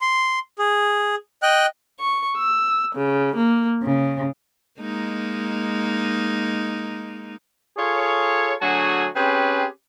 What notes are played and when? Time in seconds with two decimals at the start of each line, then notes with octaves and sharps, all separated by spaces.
0.01 C6
0.59 G#4
1.43 D#5 G5 F#6
1.98 C#6
2.38 E6
2.97 C#3
3.38 A#3
3.83 C#3
4.80 G#3 A#3 D#4
7.78 F4 G#4 A4 C#5
8.61 D3 F#3 A3 F#4 G#4 G#5
9.16 C4 C#4 G4 G#4 B4 C5